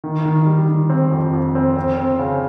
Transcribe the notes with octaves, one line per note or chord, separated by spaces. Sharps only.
D#3
D#3
G3
D#3
C4
F2
F2
C4
C4
C4
C#3